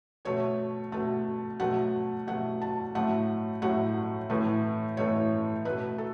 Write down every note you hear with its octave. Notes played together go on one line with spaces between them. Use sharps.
B2 A3 C#5
B2 A3
B2 F#3 A3 F#5
B2 F#3 A3 F#5
A5
A2 F#3 A3 F#5
A2 F#3 A3 F#5
A2 E3 A3
A2 E3 A3 C#5
B2 A3 B4
A4